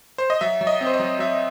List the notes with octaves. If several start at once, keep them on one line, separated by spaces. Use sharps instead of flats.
C5
D#5
F#3 E5
F#3
D#5
C4
C5
D#5
F#3
F#3 E5